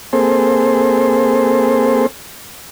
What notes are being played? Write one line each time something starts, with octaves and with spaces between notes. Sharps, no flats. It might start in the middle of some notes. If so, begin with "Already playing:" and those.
A#3 C4 G#4 A4 C5